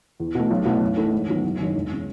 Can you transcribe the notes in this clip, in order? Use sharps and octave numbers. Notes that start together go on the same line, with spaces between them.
E2
B2 A3
B1
B2 A3 E4
F#2
E3 A3 E4 A4
G#2
D#3 F#3 B3
F#1
F#2 D#3
E1
C#3